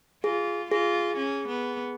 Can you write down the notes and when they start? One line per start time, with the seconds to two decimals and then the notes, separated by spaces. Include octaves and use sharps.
0.24 F4 G#4
0.72 F4 G#4
1.17 C#4
1.48 B3